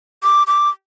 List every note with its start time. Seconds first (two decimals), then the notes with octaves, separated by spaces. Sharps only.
0.23 D6
0.47 D6